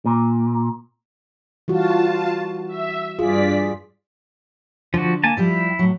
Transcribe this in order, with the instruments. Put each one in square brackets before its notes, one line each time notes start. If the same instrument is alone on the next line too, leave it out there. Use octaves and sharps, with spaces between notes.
[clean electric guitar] A#2
[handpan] E3 G3 F#4 [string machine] F4 A5
[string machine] E5
[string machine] G2 D5 B6 [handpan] F4 G#4
[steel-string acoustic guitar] D3 [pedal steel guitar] F3 F#4
[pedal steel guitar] A#3 G#5 A5
[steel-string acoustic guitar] F3 G3 G4 [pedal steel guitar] E4
[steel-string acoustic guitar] A2 F#3